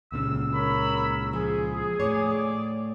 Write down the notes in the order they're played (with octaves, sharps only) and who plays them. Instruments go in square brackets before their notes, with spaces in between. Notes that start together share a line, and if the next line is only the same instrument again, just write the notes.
[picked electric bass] C#2 A#2 C#3 [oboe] E6
[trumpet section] A#4 C#5 B5
[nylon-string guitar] F3 [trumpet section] G#4
[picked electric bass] A2 [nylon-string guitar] C#5 [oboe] D5